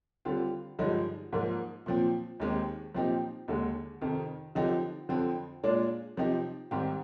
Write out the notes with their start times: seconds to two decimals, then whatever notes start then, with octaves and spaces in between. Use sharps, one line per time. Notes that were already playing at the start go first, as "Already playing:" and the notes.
0.25 D3 G3 C4 F4
0.79 G2 D3 F3 G#3 D#4
1.33 G#2 F3 A#3
1.86 A#2 F3 C4
2.40 D#2 D#3 G#3 C4 G4
2.95 A#2 F3 C4 D#4 G4
3.48 D#2 D3 G#3
4.01 F2 C3 D#3
4.55 D3 F3 C4 D#4 G4
5.09 F2 D3 F3 C4
5.63 A#2 G#3 D4 F4
6.17 C3 F3 C4 D#4 G4
6.71 G#2 D#3 G3 C4 G4